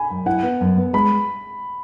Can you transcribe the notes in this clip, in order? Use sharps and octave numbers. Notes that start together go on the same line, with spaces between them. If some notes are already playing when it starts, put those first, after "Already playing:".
Already playing: G#5 B5
F#2
E4 F#5
B3
F#2
B3
G#3 B5